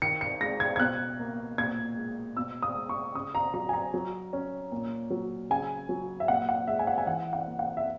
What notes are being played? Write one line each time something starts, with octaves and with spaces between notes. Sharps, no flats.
D#3 C#7
C#7
G#3 A#6
G#6
G#6
B2 F#6
A#3
A#2 G#6
G#3
B2 E6
D#6
G#3
C#6
C#3 D#6
A#5
F#3 A#5
G#5
A#5
F#3
C#4
A#2
F#3
C#3 G#5
F#3
E5
A#2 F#5
F#5
G#3 E5
G#5
F#5
G#5
E3 F#5
F#5
A#3
F#5
E5